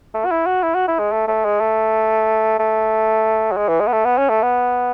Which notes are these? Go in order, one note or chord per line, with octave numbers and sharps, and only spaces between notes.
A3
F#4
E4
F#4
E4
F#4
E4
G#3
A3
A3
G#3
A3
A3
F#3
G#3
E3
G#3
B3
A3
B3
C#4
A3
B3